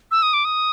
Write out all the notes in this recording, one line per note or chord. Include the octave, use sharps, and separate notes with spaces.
E6
D#6
D6
D#6